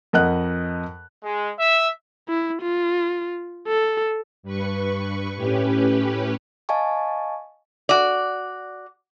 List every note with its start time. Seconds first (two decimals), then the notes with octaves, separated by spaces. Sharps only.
0.13 F2 A#4 D#5 F#5 F#6
1.24 G#3
1.59 E5
2.29 E4
2.62 F4
3.67 A4
4.43 G2 B4 C#6
5.36 A2 C#4 G4 B4
6.69 D#5 F5 G#5 A5 C#6
7.89 F#4 D5